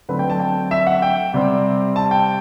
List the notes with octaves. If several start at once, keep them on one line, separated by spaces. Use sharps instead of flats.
D3 F#3 A3 C4 B4
G5
A5
G5
E5
F#5
G5
C3 G3 C4
A5
G5